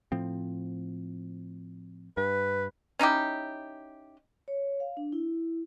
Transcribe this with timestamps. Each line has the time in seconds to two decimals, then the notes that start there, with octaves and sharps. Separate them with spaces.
0.12 A2 F3 C4
2.17 G2 B4
2.99 C#4 D#4 E4 G4
4.48 C#5
4.80 F5
4.97 D4
5.13 E4